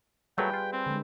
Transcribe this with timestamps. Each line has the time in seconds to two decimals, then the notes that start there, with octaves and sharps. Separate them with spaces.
0.38 A#2 F#3 G3 A3 G#4 B4 G5
0.54 F4
0.73 C4
0.86 D3 G#3